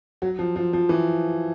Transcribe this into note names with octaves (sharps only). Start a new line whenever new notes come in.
F#3
F3
F3
F3
E3